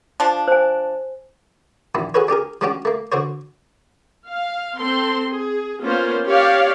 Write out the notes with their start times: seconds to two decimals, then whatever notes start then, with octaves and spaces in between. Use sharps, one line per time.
0.20 F3 D4
0.48 C5 G#5
1.95 A#1 D#2 A#2 E4
2.14 F#4 G#4 A4 B4 C#5
2.28 D4 G4 G#4 A#4
2.61 F#3 G#3 C#4 D4 F#4 G4
2.85 A3 A#3
3.12 D3 F#4 C5 C#5
4.27 F5
4.77 C4 A4 C6
5.30 G#4
5.82 A#3 B3 C#4 F4 C5
6.27 G4 C#5 D5 F5